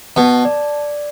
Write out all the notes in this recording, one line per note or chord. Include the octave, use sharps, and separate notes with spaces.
B2 A5
D5